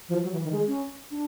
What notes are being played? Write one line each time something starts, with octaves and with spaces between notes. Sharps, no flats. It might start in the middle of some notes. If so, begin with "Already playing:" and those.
F3
F#3
E3
D#3
G#3
C#4
D4